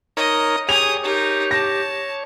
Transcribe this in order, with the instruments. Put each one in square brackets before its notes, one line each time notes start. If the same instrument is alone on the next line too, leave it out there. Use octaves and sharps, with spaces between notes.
[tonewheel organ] D#4 A#4 C#5 [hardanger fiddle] D#5
[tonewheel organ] G4 G#4 C#5 [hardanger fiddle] G#5 D#6 [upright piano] F7
[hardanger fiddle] D#4 A#4 [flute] G4 [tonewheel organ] C#5
[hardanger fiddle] A5 [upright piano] A#6